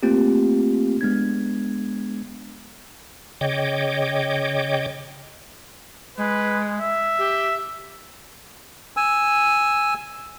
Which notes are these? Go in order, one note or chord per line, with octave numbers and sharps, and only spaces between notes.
A3 A#3 C4 F4 G4
G#3 B3 D4 G#6
C#3 C#5 D#5 G5 D6
G#3 B4
E5
G4
G#5 E6